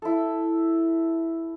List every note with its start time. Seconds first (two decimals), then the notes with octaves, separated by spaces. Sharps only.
0.02 E4 A4